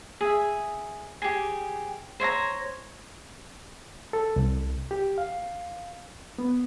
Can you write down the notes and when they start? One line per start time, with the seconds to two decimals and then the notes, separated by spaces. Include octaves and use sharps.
0.21 G#4 E5
1.22 G4 G#4
2.20 C5 C#5 E5 A#5
4.13 A4
4.36 C2
4.91 G4
5.18 F5
6.38 B3